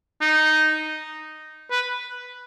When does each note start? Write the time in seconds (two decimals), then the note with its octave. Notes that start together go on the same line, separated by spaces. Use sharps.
0.21 D#4
1.71 B4